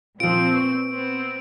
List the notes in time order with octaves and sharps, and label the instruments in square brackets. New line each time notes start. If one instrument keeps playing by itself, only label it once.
[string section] A#2 C4 [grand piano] F3 F4 [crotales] D7
[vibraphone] B4 [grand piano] C#6
[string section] B3 C4